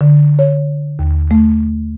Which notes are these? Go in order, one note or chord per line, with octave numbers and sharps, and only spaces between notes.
D3
C#5
D#2
A3